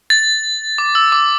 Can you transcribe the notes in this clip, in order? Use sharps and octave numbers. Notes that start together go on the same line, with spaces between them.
A6
D6
E6
D6